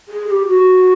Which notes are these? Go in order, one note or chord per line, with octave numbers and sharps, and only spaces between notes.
G#4
G#4
G4
F#4